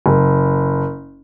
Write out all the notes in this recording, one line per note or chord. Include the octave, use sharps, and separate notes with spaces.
F#1